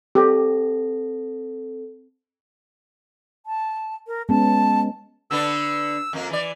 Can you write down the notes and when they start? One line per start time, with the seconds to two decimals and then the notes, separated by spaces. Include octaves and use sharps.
0.15 C4 G4 A4 A#6
3.46 A5
4.07 A#4
4.29 G#3 B3 C#4 A5
5.31 D3 B3 D4 E6
6.13 F2 A#3
6.30 E3 D5